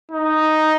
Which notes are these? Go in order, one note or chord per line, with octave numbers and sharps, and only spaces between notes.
D#4